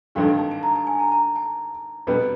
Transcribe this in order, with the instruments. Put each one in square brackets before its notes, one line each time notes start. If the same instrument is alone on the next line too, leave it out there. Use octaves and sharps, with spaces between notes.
[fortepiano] G#1 G2 D3 [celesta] F5
[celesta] A5
A5
A#5
A5
G#5
A#5
A#5
A5
[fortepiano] B2 G3 B3